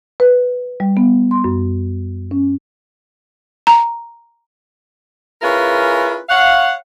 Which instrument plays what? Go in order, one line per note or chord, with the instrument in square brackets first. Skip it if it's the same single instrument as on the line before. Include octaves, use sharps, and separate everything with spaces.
[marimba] B4
G3
B3
C6
F#2
C#4
[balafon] A#5
[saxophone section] C#4 E4 F4 G#4 A#4 B4
C#5 F5 F#5